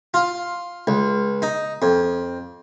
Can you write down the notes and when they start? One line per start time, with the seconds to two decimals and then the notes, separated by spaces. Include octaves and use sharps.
0.14 F4
0.87 C#2
1.42 D#4
1.82 F2